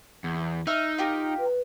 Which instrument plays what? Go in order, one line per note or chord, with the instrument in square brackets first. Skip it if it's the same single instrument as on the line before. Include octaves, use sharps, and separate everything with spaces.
[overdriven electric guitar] E2
[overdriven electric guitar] D#4 [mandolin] E5 F6
[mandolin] F4 G4 A#4
[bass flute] B4